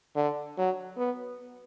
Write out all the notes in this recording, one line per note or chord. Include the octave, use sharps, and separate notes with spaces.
D3
F#3
B3